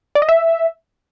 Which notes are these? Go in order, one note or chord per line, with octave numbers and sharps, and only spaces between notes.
D5
D#5
E5